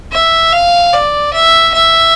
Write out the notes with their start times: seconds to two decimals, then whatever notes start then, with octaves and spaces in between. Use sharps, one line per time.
0.12 E5
0.52 F5
0.93 D5
1.33 E5
1.74 E5